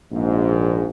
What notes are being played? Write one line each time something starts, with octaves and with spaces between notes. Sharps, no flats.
A#1 G#2